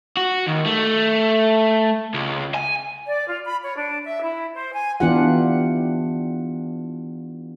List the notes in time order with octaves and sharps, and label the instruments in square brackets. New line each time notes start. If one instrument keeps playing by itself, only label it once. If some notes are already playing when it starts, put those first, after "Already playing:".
[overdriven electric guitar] F#4
D#2
A3
C#2
G#5
[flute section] D5
F4
B5
C#5
D4
E5
E4
C5
G#5
[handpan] E3 B3 D4 F4 G4 F#5